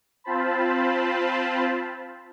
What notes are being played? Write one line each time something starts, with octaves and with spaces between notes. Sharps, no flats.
C4 F4 C5 A5 B5